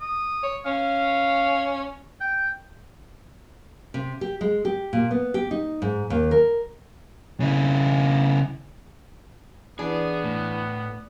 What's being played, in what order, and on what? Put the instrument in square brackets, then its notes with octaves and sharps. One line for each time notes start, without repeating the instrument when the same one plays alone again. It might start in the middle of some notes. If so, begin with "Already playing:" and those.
[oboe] D#6
[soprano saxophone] C#5
[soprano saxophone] C#4 [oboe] F5
[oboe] G5
[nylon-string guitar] C3
G4
G#3
G4
A#2
B3
G4
D#4
G#2
D#2
A#4
[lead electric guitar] C#3 E4
[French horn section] E3 [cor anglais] B3 [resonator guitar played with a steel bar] D4 [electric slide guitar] G#4
[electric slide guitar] A2